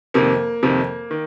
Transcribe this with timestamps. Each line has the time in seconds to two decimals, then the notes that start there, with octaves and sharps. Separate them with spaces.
0.14 F2 C3 D#3 A#3
0.63 F2 C3 D#3
1.11 D#3